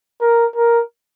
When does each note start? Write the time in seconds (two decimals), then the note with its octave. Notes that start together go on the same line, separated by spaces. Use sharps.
0.21 A#4
0.56 A#4